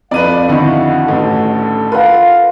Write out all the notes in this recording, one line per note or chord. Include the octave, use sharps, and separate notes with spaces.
F2 B4 D5 F5 D#7
D3 D#3 E4 F#4 F#5
A1 A4
F4 B4 F#5